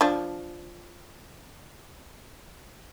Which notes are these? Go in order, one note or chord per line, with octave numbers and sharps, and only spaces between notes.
F3 D4